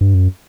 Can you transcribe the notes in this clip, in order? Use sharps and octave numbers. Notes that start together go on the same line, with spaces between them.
G2
F#2